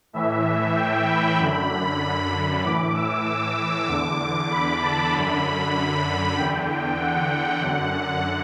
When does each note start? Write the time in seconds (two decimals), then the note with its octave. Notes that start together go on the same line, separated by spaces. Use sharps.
0.13 A2 E3 E5
0.75 G5
1.07 B5
1.38 F#2 D3
2.62 A2 E3 D6
2.94 E6
3.25 E6
3.87 E2 D3 D6
4.50 B5
4.81 A5
5.11 F#2 D3 B5
6.37 E2 D3 G5
6.99 F#5
7.61 F#2 D3